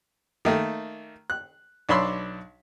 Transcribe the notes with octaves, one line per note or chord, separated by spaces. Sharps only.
D#3 A3 A#3
F#6
B1 D4 C#5 B5 C6 E6